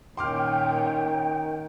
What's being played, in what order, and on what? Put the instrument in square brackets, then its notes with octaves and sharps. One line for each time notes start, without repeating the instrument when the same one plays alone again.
[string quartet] A#2 C#4 [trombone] D#3 [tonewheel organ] G5 [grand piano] C6 D6 F6